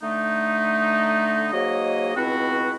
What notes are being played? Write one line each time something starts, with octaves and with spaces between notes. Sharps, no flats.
D3 A3 D#4
G#2 F#3 A#3 C#5 D#5
C#2 B2 C4 E4 F#4